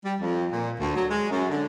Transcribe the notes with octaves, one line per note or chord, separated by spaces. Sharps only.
G3
F2
A#2
D2
F#3
G#3
F#2
D3